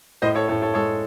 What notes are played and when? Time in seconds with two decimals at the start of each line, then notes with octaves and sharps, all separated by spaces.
0.22 A2 C5 D#5
0.35 A4 C#5
0.48 A2 A4 C#5
0.62 A4 C#5
0.74 G#3 A4 C#5